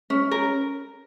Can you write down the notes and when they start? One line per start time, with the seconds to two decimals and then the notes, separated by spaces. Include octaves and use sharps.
0.10 C#4
0.31 A#4